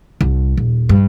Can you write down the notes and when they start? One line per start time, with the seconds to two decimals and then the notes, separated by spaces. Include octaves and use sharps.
0.21 C2
0.57 D#1
0.89 G2